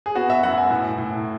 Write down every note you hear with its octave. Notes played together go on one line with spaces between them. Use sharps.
G#4
B3 F#4
E5
F#2 F#5
G#5
A2
A2